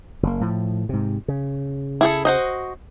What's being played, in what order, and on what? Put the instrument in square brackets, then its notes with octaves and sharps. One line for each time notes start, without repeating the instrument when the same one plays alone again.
[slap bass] F#1 A#3
A2 F3
G#2 C3
C#3
[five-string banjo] E4 G#4 A4
F#4 C5 D#5